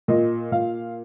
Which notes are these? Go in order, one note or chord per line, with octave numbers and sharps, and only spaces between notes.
A#2 D#5
A#2 F5